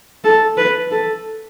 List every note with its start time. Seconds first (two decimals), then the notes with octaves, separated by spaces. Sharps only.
0.24 A4
0.57 B4
0.91 A4